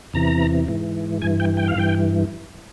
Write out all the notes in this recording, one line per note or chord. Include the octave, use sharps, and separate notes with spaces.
E2 C3 E3 A#5
G#2 E3
G2 E3 G#5
G5
G5
F5
G2 E3 G5